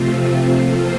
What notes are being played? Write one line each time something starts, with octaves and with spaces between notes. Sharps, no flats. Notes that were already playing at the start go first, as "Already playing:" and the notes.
Already playing: C3 F3 A3 C4 F4
F3 A#3 F4 A4 C5